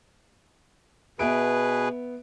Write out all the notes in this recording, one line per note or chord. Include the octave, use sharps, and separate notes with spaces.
B2 B3 G#4 B4 E5 D7